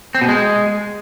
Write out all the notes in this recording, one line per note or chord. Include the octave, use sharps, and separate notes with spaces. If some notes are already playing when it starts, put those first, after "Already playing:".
C4
B2
G#3